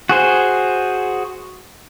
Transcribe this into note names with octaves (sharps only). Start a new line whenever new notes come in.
F#4 G#4 C5